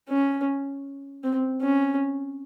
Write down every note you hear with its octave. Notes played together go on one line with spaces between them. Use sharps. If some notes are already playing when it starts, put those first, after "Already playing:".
C#4
C4
C#4